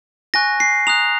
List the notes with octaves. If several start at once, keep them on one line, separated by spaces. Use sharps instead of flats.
G#5 C#6 F#6 A#6
C7
A#5 D#6 F#6 F7